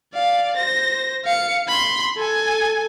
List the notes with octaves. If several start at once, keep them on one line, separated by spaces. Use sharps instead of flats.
D5 F5
C5 A#6
F5 C#7
B5 C6
A4 G#5